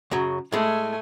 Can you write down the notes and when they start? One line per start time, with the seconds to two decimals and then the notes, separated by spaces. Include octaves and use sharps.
0.11 F#2 C#3 F#3
0.52 A2 G#3 A3 G#5